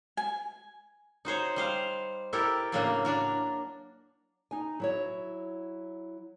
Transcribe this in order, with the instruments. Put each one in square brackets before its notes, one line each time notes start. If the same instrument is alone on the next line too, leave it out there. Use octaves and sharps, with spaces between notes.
[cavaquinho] G#5
[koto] D#4 F#4 C5 C#5
G3 C5 F5 F#5
E4 G4 A4 A#4
A2 C#3 F#3 A#3 D4 F#4
D4 F#4 A#4
[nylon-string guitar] D#4 G#5
F#3 E4 C#5